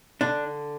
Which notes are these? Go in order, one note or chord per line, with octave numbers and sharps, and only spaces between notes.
D3 D4